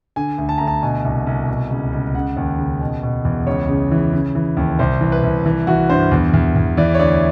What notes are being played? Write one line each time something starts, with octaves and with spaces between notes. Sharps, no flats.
D3 G#5
D2
A5
D2 A#5
A5
B2 G#5
C2
C2
B2
C#2
C#2
C#3 F#5
D#2
C#3
B2
B2
E2
C#2 C#5
C#3
E3
C#3
E3
D#2
C2 C5
E3
B4
C2
E3
E3 F#4
G2 C5
E2
E2
E2
E3 D5
C#5
D2 D5